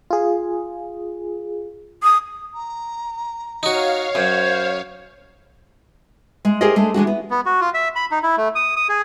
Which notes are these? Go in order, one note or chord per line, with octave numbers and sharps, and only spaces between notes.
F4 G#4
D#6
A#5
D#4 F#4 C#5 F5
F#2 C5 G#6
G#3
G4 G#4 A#4 C5 D#5
G#3 A3 D4
E3 G#3 D4 F#4
B3
B3
F#4
F4
E5
B5
D#4
E4
A3
D#6
D#6
G#4